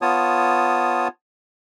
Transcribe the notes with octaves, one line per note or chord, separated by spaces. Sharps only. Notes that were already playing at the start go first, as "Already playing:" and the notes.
B3 F4 C#5 A5 D#6